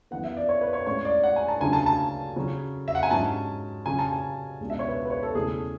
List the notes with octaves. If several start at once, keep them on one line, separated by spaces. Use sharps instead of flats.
F#2 E3 B3 F#5
E5
D5
C#5
B4
C#5
A2 G#3 C#4 C#5
D5
F#5
G#5
A5
D2 C#3 F#3 C#4 G#5
A5
A5
C#3 F#3 C#4
E5
F#5
G#5
G#2 F#3 C#4 A5
C#3 F#3 C#4 G#5
A5
G#5
C#2 B2 G#3 D4
E5
C#5
B4
B4
C#5
A4
E2 C#3 E3 A3 C#4 G#4